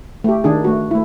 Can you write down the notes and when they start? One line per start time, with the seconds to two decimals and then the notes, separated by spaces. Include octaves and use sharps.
0.24 A3 G4
0.44 D#3 D4 G#4
0.64 A3 F#4
0.91 A3 E4